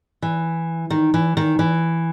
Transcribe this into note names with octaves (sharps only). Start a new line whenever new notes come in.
E3
D#3
E3
D#3
E3